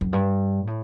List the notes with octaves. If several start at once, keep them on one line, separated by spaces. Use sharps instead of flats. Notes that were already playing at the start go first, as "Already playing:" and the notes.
F#2
G2
A2